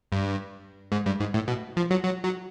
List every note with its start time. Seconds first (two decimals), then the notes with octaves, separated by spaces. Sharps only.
0.12 G2
0.92 G#2
1.06 G2
1.19 G#2
1.34 A2
1.48 B2
1.77 F3
1.90 F#3
2.04 F#3
2.24 F#3